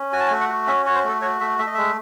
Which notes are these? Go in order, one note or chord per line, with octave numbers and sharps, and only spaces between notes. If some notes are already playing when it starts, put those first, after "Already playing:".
Already playing: C#4
F#4 G#5
A5
G#5
A3
F#5
F#4
C#4 E5
F#4 C#5
C5
A3 A4
F#4 C#5
A3 E5
A3 E5
D#5
G#3 E5